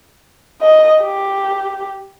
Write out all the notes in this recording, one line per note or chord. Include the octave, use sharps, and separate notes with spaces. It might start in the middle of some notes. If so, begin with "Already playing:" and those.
D#5
G4